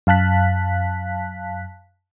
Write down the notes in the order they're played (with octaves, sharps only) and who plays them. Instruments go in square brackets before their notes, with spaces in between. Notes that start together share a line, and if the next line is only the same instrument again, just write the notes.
[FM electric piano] F#2 F5 A5 F#6 B6